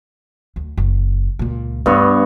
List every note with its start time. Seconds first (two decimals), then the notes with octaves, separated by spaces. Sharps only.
0.56 D2
0.77 F#1
1.39 C#2 A#2
1.86 G2 D3 B3 C#5